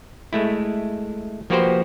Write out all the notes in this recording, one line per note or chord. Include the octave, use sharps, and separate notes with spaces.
G#3 A3 E4
F3 A#3 F#4 G4 B4 C5